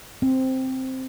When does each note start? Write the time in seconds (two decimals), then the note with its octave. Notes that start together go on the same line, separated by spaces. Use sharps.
0.22 C4